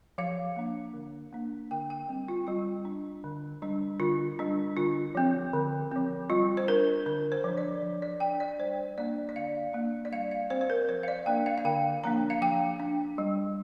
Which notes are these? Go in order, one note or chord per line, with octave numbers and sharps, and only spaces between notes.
F3 F5
A#3 D4
D3
A#3 D4
D3 G5
G5
G3 C4
F4
G3 F4
D4
D3
G3 D4
D3 F4
G3 D4
D3 F4
F3 C4
D3
F3 C4
G3 F4
C5
D4 A#4
D3 A#4
C5
F3 D4
D5
F3
D5
D4 G5
D5
G3 C5
A#3 D4 D5
D5
D3 F5
A#3 D4
D5
G3 F5
F5
C4 C5
C5
A#4
F3 C5
F5
D5
A#3 D4 G5
F5
F5
D3 G5
F3 A#3 D4 A#5
F5
F3 G5
D4
G3